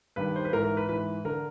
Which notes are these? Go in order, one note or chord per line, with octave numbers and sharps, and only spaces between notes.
G2 D#3 B4
C5
B4
G#2 E3 A#4
A#4
B4
G#2 E3 B4
D3 A#4